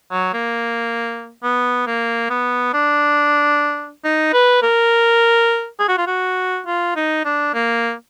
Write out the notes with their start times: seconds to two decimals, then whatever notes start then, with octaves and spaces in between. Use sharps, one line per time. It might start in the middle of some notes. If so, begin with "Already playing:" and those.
0.12 F#3
0.34 A#3
1.43 B3
1.87 A#3
2.30 B3
2.74 D4
4.04 D#4
4.33 B4
4.62 A#4
5.80 G#4
5.88 F#4
5.98 F4
6.07 F#4
6.66 F4
6.96 D#4
7.25 D4
7.54 A#3